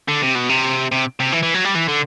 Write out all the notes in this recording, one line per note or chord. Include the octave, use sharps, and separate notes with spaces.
D3
C3
B2
C3
C3
C3
E3
E3
F#3
G3
E3
D3